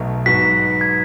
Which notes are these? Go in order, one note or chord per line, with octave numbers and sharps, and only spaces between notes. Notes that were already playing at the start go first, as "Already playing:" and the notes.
Already playing: B1 B2 F#3 A3
G#2 F#3 B3 F#4 B6
G#6